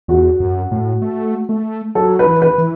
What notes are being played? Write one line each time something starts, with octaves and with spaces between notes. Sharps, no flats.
E2 F#4
F#2
A2
A3
A3
F#3 A4
F#3 B4
E3
B4
E3